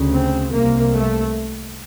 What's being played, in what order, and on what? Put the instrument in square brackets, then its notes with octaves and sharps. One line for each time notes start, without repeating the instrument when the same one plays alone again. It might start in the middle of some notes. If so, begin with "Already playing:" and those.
Already playing: [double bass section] D2 C#3
C4
C2 C3 A#3
A3